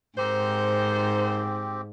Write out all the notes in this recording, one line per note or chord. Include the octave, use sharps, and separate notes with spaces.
G#2 C4 D#4 G4 A#4 C5